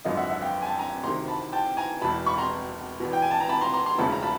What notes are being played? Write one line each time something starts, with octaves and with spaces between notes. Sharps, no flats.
G#1 F#2 D3 F3 D#5 F5
E5 F#5
E5 F#5
F5 G5
G#5
G5 A5
G#5 A#5
D2 C3 D#3 A#5 C6
A5 B5
G5 A5
G#5 A#5
E1 E2 B2 A5 B5
B5 C#6
A#5 C6
E2 B2
G5
G#5
A5
A#5
A5 B5
A#5 C6
A#5 C6
A#5 C6
E1 D2 C#3 F3 A5 B5
A#5
A5 B5